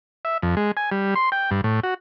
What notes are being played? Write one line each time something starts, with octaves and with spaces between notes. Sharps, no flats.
E5
F2
G#3
G#5
G3
C6
G5
G2
A2
F#4